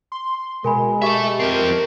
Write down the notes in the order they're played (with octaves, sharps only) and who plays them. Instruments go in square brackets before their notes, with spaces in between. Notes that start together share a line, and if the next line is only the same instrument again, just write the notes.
[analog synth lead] C6
[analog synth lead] B2 [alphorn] G#3 [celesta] A#4 G#5 B5
[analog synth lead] G4 [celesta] D#5 C#6 [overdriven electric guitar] E5 A5
[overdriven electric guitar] F2 C4 [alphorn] A#4